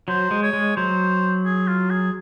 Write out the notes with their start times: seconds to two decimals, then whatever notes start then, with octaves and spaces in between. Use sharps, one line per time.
0.08 F#3 C5
0.31 G#3
0.43 C#5
0.53 G#3
0.77 F#3 C5
1.45 G#4
1.68 F4
1.90 G#4